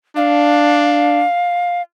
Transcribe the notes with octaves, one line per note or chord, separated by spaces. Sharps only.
D4 F5